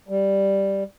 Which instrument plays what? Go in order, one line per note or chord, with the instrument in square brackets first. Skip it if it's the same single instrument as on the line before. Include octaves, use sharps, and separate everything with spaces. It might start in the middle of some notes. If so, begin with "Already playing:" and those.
[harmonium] G3